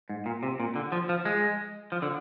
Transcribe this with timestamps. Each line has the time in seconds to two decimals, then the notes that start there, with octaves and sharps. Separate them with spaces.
0.09 G#2
0.26 A#2
0.43 C3
0.60 A#2
0.76 D3
0.92 F3
1.09 F3
1.25 G#3
1.92 F3
2.02 D3